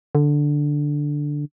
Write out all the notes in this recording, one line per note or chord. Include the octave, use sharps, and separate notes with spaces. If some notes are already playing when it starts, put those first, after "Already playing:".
D3